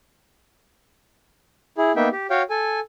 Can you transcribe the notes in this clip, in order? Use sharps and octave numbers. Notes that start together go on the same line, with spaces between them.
E4 G#4
A#3 B3 D#4 E5 G5
G4
F#4 C#5 F5 G5
A4 G#5